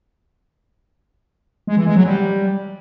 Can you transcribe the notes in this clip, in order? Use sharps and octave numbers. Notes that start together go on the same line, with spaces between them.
G#3
E3
G#3
F#3
G3